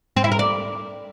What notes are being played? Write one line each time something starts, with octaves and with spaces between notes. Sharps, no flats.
C4
E4
A#4
D5